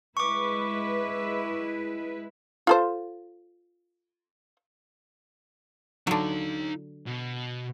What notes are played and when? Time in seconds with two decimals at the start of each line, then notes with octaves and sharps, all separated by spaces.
0.17 G#3 E4 B4 C#6 D6
2.67 F4 A4 C5
6.07 D3 F#3 D#4 F5
7.07 B2